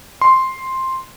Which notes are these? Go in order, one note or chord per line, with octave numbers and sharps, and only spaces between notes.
C6